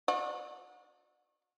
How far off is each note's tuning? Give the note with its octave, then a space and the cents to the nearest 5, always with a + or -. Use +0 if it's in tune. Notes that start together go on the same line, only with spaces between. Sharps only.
F#4 -35 D5 +35